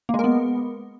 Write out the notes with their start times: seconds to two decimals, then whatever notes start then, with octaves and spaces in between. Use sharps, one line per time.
0.09 A#3
0.14 G#3
0.19 A#4
0.24 B3